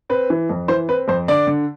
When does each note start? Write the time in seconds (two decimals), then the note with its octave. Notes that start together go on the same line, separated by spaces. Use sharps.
0.09 C4 B4
0.30 E3
0.50 F2
0.68 E3 C5
0.89 C4 B4
1.08 F2 C5
1.28 D3 D5
1.47 D3